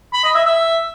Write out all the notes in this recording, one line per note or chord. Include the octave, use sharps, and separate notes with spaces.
B5
D#5
E5
E5